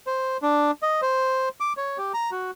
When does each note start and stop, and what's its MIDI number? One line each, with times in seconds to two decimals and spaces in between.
0.07 0.37 72
0.42 0.71 62
0.83 1.01 75
1.02 1.49 72
1.60 1.73 86
1.77 1.98 73
1.98 2.12 67
2.14 2.30 82
2.31 2.51 66